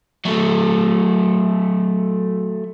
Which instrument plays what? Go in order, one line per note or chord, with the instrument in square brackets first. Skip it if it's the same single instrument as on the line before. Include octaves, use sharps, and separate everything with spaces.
[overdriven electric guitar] F#3 A3